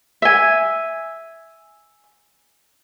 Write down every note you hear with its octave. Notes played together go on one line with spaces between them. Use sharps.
E5 G#5